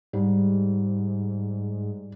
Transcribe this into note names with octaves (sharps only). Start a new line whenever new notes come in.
G#2 G3